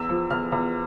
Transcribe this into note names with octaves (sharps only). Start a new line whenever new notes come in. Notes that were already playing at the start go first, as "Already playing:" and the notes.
Already playing: E2 E6
F3
E2 F6
E2